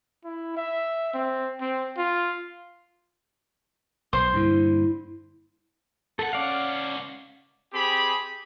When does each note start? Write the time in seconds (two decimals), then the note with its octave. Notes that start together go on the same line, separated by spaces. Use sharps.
0.25 E4
0.57 E5
1.14 C4
1.61 C4
1.98 F4
4.13 B1 C5 C6
4.34 G2 A#2 D3 E4
6.19 C#2 A4 F#5
6.33 C#4 D5 F5
7.73 C4 G4 G#4 B5